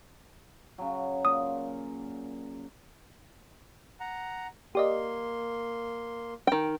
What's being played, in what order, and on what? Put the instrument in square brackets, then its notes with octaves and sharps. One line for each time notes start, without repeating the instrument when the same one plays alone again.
[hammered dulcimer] C#3 F#3
[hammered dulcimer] A#2 [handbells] D#6
[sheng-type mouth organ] F#5 A#5
[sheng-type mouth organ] A#3 C6 [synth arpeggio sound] G4 D5 D#5
[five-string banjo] D#3 G5